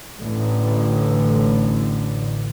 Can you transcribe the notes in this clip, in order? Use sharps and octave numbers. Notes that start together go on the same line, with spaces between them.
A1 A2 D3